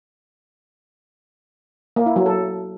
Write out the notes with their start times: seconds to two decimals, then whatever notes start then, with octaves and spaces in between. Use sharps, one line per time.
1.96 A#3
2.06 E4
2.16 F#3
2.26 A4